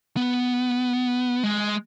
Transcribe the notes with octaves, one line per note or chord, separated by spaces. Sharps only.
B3
G#3